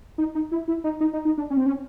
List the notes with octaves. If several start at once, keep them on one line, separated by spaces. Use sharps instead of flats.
D#4
D#4
E4
E4
D#4
D#4
D#4
D#4
D4
C#4
C4
C#4